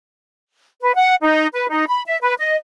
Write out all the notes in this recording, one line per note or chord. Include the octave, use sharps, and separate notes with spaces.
B4
F#5
D#4
B4
D#4
B5
E5
B4
D#5